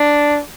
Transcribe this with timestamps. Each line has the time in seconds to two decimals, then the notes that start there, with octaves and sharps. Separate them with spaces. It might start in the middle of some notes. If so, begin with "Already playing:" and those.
Already playing: D4